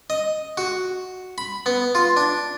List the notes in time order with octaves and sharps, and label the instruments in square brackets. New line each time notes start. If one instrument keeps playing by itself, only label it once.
[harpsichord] D#5
F#4
B5
B3
F4
D4